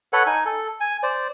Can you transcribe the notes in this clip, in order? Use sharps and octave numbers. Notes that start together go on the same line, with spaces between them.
A4 B4 C#5 F#5
D#4 G#5
A4
G#5
C5 D5